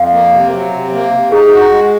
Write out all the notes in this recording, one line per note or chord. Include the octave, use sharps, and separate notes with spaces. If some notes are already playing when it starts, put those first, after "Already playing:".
Already playing: F2 F5
A#3
C3
F#3
C3
A#3
C3
D#4 G#4
F#4
G#3